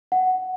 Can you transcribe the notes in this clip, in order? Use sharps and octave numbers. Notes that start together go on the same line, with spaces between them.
F#5